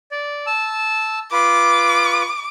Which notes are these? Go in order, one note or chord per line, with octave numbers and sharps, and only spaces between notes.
D5
A5 E6
F4 B4 D6